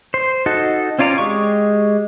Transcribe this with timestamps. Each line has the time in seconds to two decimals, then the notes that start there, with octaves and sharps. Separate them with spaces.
0.14 C5
0.46 D#4 F#4 A4
0.99 C4 C#4 F4 D5 A#5
1.18 G#3 G4 C#6